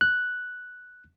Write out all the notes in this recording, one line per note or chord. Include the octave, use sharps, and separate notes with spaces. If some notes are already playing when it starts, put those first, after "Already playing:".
F#6